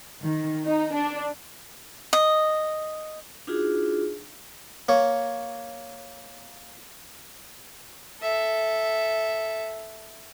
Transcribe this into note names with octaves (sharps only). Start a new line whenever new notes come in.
D#3
D#4
D4
D#5
D4 D#4 F4 F#4 G#4
A#3 C#5
A4 E5